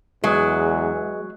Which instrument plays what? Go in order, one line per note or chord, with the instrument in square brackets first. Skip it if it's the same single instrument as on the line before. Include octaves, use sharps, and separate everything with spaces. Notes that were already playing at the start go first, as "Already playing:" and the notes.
[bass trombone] E2 [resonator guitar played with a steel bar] F#3 [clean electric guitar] G#3